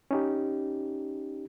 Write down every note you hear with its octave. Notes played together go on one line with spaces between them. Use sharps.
C#4 D#4 G4